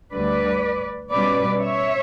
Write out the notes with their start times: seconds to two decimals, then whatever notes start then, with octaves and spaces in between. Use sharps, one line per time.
0.13 D2 D3 G3 B4 D5
1.12 B2 G3 C#4 B4 D5
1.61 C#5 E5